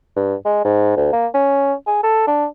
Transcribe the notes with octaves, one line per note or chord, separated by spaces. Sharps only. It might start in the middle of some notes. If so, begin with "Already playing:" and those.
G2
G#3
G#2
D2
A#3
C#4
G#4
A4
D4